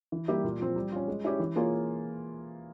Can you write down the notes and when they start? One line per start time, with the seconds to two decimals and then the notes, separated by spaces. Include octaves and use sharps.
0.12 E3
0.28 G3 A#3 E4 G4
0.44 A#2
0.60 F3 C4
0.76 G3
0.92 C#4 F4
1.08 G#3
1.24 C#4 E4 G4 C#5
1.39 E3
1.56 A#3 F4 G#4 C#5